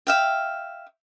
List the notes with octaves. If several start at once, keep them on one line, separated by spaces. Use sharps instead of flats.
E5 F5 G5